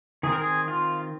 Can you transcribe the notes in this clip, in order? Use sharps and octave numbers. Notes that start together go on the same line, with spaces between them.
D#3 C4 G#4
A#4
G#4
F4